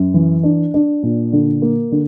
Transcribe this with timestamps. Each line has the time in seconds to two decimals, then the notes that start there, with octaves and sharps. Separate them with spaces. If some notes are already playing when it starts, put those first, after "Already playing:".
Already playing: F#2
0.14 E3
0.43 D4
0.74 D4
1.03 A#2
1.33 D3
1.62 A#3
1.92 D3